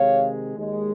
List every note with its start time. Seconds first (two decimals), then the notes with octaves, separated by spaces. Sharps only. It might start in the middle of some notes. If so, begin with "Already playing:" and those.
Already playing: C3 D#3 G#3 C#5 F5
0.57 D#2 D#3 G#3